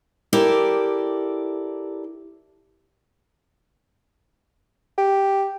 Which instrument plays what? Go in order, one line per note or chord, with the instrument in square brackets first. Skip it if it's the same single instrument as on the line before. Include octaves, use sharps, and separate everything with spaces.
[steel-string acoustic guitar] E4 G4 A4 A#4 D5
[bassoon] G4